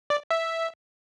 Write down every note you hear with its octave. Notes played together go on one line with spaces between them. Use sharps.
D5
E5